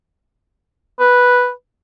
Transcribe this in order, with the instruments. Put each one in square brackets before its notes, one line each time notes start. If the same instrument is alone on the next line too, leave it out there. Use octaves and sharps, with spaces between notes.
[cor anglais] B4